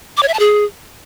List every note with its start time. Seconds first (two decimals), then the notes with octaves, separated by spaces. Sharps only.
0.17 D6
0.23 C#5
0.28 E5
0.34 A5
0.39 G#4